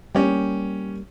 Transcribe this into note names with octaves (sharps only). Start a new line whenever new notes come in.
G3 A#3 C#4 G4